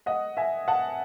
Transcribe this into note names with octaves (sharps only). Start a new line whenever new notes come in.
D#5 F#5
E5 G#5
F#5 A5